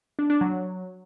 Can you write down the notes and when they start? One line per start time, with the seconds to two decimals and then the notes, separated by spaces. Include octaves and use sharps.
0.19 D4
0.30 D4
0.41 F#3